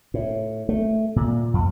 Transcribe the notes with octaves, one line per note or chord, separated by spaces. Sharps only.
A2
A3
A#2
F2